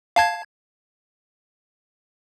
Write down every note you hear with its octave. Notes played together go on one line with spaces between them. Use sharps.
F5 A5 G#6